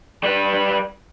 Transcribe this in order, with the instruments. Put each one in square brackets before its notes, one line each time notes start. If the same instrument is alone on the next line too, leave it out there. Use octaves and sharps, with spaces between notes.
[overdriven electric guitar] G3 B4